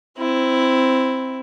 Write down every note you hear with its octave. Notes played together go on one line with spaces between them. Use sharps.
C4 E4